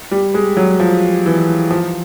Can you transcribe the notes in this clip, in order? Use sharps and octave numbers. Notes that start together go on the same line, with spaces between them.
G3
G#3
F#3
F3
E3
F3